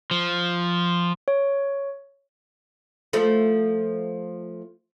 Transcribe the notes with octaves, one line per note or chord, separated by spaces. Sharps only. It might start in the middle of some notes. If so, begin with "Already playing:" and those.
F3
C#5
F3 A3